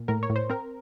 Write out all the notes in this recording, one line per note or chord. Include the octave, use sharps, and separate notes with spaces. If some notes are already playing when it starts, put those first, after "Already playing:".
Already playing: A#2
A2 A#4
C#5
A2
C5
C4 A#4